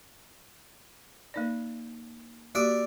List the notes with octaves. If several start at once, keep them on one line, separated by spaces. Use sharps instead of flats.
A#3 D#4 D5
A#3 F#4 G4 D5 E5